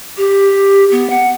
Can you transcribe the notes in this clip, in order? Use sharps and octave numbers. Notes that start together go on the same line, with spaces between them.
G4
B3
F#5